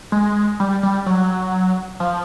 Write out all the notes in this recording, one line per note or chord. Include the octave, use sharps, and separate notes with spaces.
G#3
G3
G3
F#3
F3